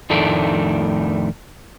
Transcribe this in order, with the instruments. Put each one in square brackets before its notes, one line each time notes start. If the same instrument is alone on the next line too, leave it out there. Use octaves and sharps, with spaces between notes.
[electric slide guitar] F2 A2 D#3 A3 D4